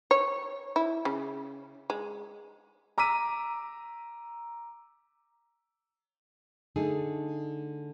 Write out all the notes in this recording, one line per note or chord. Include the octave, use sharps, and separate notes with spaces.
C#5
E4
C#3
G#3
A#5 D6 E6 B6 D#7
D3 A3 D#4 G#4